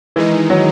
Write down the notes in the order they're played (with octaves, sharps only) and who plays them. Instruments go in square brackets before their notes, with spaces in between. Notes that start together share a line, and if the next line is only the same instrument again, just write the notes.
[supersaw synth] D#3 G#3 D#4 [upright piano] E3
[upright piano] F#3